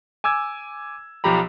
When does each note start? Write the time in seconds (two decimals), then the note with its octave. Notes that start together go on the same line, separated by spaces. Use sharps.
0.24 G#5 D6 E6 G#6
1.24 B1 F3 G4 A#5 B5